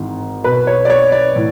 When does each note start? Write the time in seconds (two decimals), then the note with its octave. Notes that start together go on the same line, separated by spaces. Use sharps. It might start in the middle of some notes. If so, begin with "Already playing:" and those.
Already playing: G#1 G#2 E3
0.44 B1 B2 B4
0.67 C#5
0.85 D5
0.90 C#5
1.12 D5
1.35 A2 E3